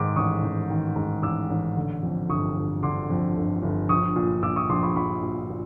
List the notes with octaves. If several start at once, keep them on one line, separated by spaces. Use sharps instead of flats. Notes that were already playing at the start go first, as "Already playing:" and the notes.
Already playing: G#2 D#3 C6 D6
A1 C#6 D#6
A1
D#3
G#2
A1 D6 E6
A1
D3
F2
G1 C#6 D#6
G1
D3 C6 D6
F2
G1
G1
A#1 C#6 D#6
A#2
A#2 D6 E6
C#6 D#6
A#1 C6 D6
B5 C#6
A#1 B5 C#6
A#2
A#2